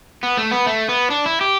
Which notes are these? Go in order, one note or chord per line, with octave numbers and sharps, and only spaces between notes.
B3
A3
B3
A3
B3
D4
E4
G4